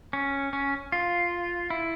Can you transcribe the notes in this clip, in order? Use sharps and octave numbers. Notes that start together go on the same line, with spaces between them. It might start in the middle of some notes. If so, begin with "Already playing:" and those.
C#4
C#4
F4
E4